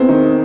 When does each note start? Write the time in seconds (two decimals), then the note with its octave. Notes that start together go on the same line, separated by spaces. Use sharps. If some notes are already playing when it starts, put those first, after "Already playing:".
Already playing: E2 C4
0.08 D#3